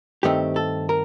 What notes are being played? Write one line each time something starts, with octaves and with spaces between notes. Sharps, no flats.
G2 D#3 A3 C4 G4
A4
A#4